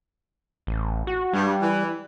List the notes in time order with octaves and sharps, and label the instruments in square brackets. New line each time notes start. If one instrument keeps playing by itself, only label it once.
[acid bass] A1
F#4
[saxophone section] G2 [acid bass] G3
[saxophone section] E3